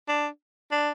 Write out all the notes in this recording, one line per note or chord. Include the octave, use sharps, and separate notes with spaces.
D4
D4